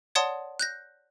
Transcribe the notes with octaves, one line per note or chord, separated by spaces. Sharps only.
C#5 D5 F#5 A5 C6 D#6
F#6 G6 A#6